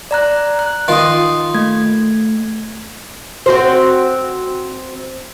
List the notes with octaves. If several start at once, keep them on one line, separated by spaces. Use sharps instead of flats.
D5 A#5 F#6
F#6
D#3 F4 C6 D#6
A3 G#6
C4 F#4 C5